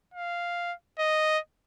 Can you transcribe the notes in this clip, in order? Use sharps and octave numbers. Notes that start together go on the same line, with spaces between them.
F5
D#5